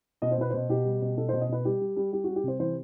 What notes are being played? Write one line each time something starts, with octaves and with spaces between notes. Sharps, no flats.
B2 D#5
C5
B2 B4
B2 C5
B2 G4
G3
B2
B2 A4
B2 C5
D#5
B2 B4
G3 G4
G3
G3
G3 G4
G3 F#4
G4
C3 C5
E3 C5